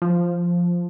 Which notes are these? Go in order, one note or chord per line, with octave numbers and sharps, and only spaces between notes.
F3